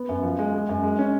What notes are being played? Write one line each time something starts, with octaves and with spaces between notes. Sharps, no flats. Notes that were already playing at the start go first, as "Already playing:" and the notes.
Already playing: B3
F#2
F3
G#3
G#3
F#2
G#3
C#4